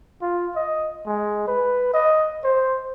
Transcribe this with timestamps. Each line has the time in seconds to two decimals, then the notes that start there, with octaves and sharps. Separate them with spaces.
0.22 F4
0.56 D#5
1.06 G#3
1.47 B4
1.93 D#5
2.44 C5